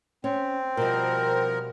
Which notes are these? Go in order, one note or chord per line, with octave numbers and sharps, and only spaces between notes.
C4 C#4
B2 F3 G3 A#4